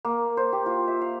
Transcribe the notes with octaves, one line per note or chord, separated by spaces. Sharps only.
A#3
C5
G4
F4
E5
F5